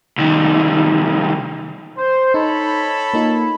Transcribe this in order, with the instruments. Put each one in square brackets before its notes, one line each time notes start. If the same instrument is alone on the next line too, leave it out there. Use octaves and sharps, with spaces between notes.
[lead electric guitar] C2 D#3
[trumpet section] C5
[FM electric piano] D#4 [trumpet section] A4 C#5 B5
[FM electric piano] A#3 D#4 F4